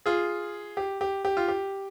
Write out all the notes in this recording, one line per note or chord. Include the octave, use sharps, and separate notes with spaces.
F4 G#4
G4
G4
G4
F4
G4